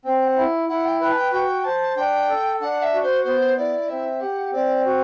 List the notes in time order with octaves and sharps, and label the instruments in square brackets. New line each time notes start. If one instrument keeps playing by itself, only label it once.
[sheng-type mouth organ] C4 [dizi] G5
[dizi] F#5
[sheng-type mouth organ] E4
[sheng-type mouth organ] E4 [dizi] F#5
[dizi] G5
[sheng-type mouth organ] B4 [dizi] G5
[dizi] A5
G5
[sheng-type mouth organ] F#4 [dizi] G5
[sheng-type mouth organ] C5 [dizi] A5
[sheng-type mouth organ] D4 [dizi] G5
[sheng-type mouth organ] A4
[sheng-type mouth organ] D4 [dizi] F#5
[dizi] E5
[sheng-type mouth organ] F#4
[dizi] C5
[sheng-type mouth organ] B3 [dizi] C5
[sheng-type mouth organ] E4 [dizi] D5
[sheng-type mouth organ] C4 [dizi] E5
[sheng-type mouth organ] G4 [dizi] F#5
[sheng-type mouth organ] C4 [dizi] D5
[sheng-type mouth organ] F#4